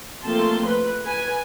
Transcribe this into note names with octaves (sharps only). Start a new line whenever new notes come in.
F3 A3 A#3 C4 A5 C6
B4
B4 G#5